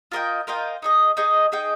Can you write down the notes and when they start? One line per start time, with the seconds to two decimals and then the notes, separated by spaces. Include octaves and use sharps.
0.12 F4 A#4 D#5 G5
0.47 F4 A#4 D#5 G5
0.82 D#4 G#4 D#5
1.17 D#4 G#4 D#5
1.52 D#4 G#4 D#5 G5